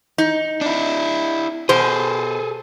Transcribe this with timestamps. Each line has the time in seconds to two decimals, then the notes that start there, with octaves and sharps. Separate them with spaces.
0.18 D#4
0.61 D4 E4
1.69 B2 G#4 A4 C5